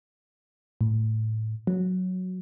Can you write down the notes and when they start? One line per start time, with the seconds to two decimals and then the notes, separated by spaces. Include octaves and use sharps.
0.81 A2
1.67 F#3